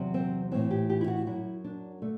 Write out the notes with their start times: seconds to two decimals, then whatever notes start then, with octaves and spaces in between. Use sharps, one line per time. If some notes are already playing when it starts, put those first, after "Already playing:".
Already playing: E2 C3 F#3
0.14 C4
0.52 A2 E3 C4
0.71 G4
0.90 G4
1.01 E4
1.08 F#4
1.27 F#2 F#3 E4
1.64 D4
2.02 D3 A3